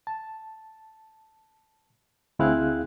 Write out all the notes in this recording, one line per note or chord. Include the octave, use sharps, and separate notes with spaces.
A5
D2 C4 E4 G#4 F5 F#6